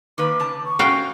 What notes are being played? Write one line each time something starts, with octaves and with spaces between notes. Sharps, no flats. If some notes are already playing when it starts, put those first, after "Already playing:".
D#3 A#3 B4 D6
C#3 A5
C#6
G#3 C#4 F#4 F5 G5